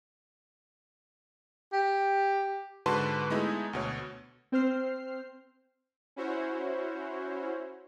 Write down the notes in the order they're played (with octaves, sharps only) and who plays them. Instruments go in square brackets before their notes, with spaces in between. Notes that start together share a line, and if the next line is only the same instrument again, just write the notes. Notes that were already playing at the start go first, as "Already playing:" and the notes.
[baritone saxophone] G4
[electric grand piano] G#2 D3 F#4 B4 A5 C6
G#3 A3 B3 D#4 E4
D2 B2 C#5
[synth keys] C4 C5 F6 C7
[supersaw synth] C#4 E4 F#4 C5 C#5